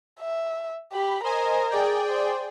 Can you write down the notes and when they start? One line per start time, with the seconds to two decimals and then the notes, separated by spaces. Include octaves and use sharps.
0.20 E5
0.93 G4 B5
1.24 A#4 C5 D#5 G#5
1.70 G#4 D5 G5
2.09 C5